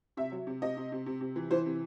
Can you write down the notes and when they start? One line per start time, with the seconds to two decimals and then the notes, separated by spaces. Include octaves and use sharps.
0.17 C3 E5
0.32 F#3
0.47 C3
0.62 C3 D#5
0.77 C3
0.92 C3
1.06 C3
1.21 C3
1.36 E3
1.51 E3 C5
1.66 C3